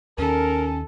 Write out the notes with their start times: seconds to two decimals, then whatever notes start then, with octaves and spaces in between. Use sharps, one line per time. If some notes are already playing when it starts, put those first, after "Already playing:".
0.18 D#2 D#3 C#4 A4 A#4